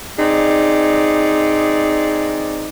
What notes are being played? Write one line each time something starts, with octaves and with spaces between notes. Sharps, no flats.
C4 D#4 G#4 D5